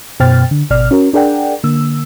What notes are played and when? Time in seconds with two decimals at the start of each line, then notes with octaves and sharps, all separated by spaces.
0.20 F#2 B2 C5 G5 F6 A6
0.51 D3
0.70 G#1 B2 D5 F6
0.91 C#4 F#4 A#4
1.13 D4 G#4 A#4 D5 F#5 G5
1.64 D3 A#3 E6